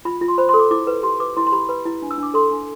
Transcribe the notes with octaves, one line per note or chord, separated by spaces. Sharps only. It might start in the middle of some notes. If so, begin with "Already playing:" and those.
F4 B5
F4
C6
C5 B5
C6
A4
D6
E4 D6
B4
G4 C6
B4 D6
E4 C6
C6
G4 B5
B4 B5
E4
D4
E6
D4 D6
A4 C6
D4